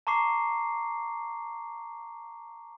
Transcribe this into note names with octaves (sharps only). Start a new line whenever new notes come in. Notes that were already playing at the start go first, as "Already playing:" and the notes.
A5 A#5 C#6 D6 C7